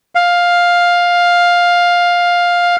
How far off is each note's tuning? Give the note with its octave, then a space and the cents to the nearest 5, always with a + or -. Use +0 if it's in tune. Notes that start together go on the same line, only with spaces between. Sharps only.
F5 +10